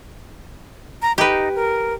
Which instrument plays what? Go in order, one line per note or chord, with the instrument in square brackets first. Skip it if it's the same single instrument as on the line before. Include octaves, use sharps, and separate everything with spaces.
[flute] A#5
[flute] D#4 [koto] G4 B4
[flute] A#4